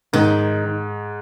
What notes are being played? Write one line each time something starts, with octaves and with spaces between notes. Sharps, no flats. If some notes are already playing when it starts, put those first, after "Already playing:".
G#2 D#3